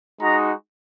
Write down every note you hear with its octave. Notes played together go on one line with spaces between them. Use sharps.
G#3 D#4 F#4 A#5